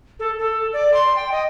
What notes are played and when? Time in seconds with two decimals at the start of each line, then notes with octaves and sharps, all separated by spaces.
0.20 A4
0.39 A4
0.73 D5
0.94 C6
1.16 G5
1.32 D#5